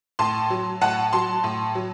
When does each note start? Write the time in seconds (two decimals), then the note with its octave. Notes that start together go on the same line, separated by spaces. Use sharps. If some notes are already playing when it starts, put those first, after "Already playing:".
0.19 A2 A5 C6
0.50 F#3
0.81 A2 F#5 A5
1.13 F#3 A5 C6
1.44 A2
1.75 F#3